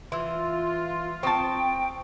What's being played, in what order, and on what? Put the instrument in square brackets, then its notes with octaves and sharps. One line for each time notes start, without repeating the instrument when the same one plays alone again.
[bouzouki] E3 [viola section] F4 [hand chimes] C6 E6
[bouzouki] C4 A5 [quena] G5 [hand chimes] C#6 D#6